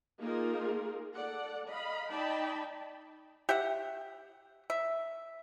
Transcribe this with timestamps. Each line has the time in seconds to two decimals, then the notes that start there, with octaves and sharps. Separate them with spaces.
0.20 A#3 D#4 F4 G#4 A#4
1.16 A4 D5 F#5
1.69 D#5 F5 B5
2.10 D#4 D5 G5 A5 B5
3.49 G4 E5 F#5
4.70 E5